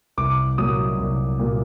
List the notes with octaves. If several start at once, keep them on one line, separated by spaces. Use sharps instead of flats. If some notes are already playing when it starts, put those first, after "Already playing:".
C2 D6
A#2 F#3 D#6
C2
A#2 F#3